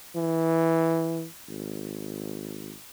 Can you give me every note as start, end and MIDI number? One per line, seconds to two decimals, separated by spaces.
0.16 1.26 52
1.48 2.74 32